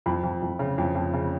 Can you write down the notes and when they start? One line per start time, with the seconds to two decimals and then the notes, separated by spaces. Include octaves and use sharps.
0.06 F2 B5
0.24 F2
0.42 F2
0.59 C#3
0.78 F2
0.95 F2
1.14 C#3